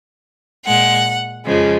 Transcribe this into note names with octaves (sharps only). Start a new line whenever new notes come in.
A#2 G#3 F#5
F2 C#3 F3 G#3